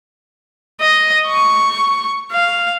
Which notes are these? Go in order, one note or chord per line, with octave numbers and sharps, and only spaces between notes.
D#5
C#6
F5